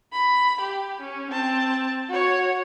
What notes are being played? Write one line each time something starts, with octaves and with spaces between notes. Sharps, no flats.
B5
G4
C#4
C4 A5
F#4 C#5